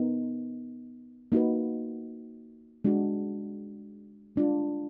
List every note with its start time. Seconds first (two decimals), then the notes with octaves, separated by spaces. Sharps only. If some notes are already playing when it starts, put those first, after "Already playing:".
Already playing: B3 D#4 A#4
1.32 A#3 D#4 F#4 B4
2.84 G#3 D4 F#4
4.36 G#3 D4 F4